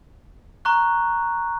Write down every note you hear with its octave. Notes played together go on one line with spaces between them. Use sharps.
A#5 C#6 F#6